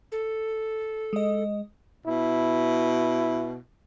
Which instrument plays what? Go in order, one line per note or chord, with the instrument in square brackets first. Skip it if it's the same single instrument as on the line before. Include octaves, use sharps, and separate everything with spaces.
[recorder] A4
[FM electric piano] G#3 D#5
[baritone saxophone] B2 [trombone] E4